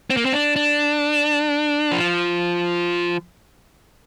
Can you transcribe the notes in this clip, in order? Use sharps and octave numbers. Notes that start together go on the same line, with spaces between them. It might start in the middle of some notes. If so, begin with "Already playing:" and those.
C4
A#3
C4
D4
D4
F3